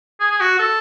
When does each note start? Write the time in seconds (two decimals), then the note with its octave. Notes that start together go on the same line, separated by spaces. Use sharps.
0.20 G#4
0.31 G#4
0.41 F#4
0.59 A4